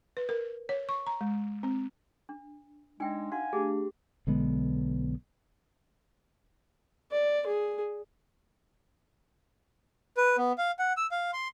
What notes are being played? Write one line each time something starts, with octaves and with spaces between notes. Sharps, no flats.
B4
A#4
C#5
C#6
A#5
G#3
C4
D4
G#3 D4 D#4 E5 G5 G#5
F#4 F5 F#5 G#5
A3 D4 G4 G#4
B1 D3 G#3 B3
D5
G#4
B4
B3
F5
F#5
E6
F5
C6